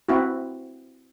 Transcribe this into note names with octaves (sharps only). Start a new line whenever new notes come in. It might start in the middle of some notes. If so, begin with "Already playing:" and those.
C4 E4 F#4